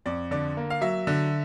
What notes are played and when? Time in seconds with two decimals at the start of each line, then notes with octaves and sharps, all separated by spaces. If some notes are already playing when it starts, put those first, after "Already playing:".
0.06 F2 D5
0.31 D3 D5
0.57 A#3
0.70 F5
0.81 F#3 E5
1.07 D3